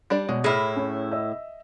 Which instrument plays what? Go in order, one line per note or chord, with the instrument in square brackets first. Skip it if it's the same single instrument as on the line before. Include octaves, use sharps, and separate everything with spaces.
[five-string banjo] G3 D4 D5
[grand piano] B2 C#5 D5 [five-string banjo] G#3
[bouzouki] A2 E4 [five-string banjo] G#4 [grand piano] F6 A#6
[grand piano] C#4
D#5 E5 E6